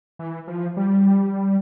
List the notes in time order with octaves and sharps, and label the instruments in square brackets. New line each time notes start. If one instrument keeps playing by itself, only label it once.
[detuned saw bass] E3
F3
G3